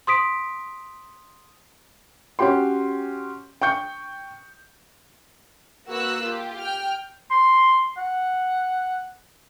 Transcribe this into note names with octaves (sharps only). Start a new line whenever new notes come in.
C6 D#6 B6 D7
C#4 F#4 G4 G5 C6
G5 C#6 G6 C#7
A#3 F#4 B4 E6 F#6
F4 G4
G5 F6
C6
F#5